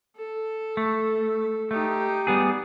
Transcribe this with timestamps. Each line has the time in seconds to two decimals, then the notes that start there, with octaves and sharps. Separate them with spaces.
0.16 A4
0.77 A3
1.71 A3 D#4 G4
2.27 G3 B3 G#4